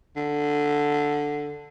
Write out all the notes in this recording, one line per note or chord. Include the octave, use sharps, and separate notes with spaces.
D3